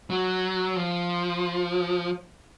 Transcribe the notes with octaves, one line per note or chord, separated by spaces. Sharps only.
F#3
F3